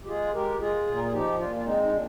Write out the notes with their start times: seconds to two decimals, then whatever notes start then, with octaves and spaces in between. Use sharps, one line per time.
0.04 G4
0.07 G#3 F4 G#4
0.34 G#3 G4 A#4
0.60 G#3 F4 G#4
0.87 A#2
0.95 A#4
1.04 G#4
1.12 F3 D#4 G4
1.38 A#2 D4 F4
1.56 F4
1.65 G#3 C4 D#4
1.83 D#4
1.92 A#2 D4